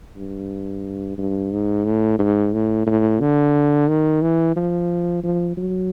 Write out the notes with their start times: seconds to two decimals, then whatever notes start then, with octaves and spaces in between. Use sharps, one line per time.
0.16 G2
1.18 G2
1.52 G#2
1.85 A2
2.19 G#2
2.53 A2
2.87 A2
3.20 D3
3.88 D#3
4.22 E3
4.56 F3
5.24 F3
5.57 F#3